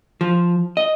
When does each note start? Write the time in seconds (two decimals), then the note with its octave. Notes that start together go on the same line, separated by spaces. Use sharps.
0.21 F3
0.77 D#5